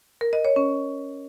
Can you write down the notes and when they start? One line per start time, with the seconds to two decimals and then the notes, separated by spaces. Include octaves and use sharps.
0.21 A#4
0.33 D#5
0.45 C#5
0.56 C#4